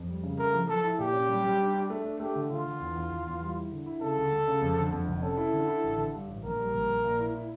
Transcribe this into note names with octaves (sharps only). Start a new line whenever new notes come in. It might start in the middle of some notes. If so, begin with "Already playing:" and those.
Already playing: F2
G3
C#3
A3 A#4
F3
F3 A4
E4
A#2 G4
C#4
G3
G3
D4
D4
A3
D4
A3 G4
D3
D3 F4
D3
E2
E2
E2
E2
G3
E4
D3
E4
C#3 A4
D2
D2
C#3
F2
D3
F2
F1
C#4 A4
E4
D3
E4
A1
D3
G2
A1
A#1 A#4
G3
A#1
A#1
A#2
E4
E4